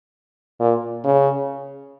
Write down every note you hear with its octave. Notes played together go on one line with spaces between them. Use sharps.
A#2
C#3